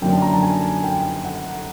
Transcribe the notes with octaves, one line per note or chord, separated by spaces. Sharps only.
F#2 D3 F#3 A#3 G5
A5
A#5
A5
G#5
G5
F#5